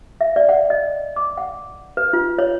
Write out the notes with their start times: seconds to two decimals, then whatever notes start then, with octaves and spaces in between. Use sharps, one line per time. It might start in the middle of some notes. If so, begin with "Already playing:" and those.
0.21 E5
0.36 D5
0.49 F#5
0.70 D#5
1.16 D6
1.37 F#5
1.97 B4
2.13 F4
2.39 C#5